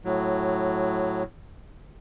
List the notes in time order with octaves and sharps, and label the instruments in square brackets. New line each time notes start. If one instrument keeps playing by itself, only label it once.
[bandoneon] A2 F#3